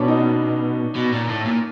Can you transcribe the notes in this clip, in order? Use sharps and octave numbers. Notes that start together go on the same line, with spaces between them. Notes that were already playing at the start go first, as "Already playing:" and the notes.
Already playing: B2 C#4 D4
D#4
B2
A#2
A2
A#2